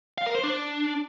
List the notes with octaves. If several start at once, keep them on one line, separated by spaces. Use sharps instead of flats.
F5
A#4
C5
D4